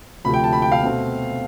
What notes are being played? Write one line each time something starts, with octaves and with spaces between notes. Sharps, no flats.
D2 C3 F3 A3 B5
G5
A5
B5
G5
F5
B2 A3 C4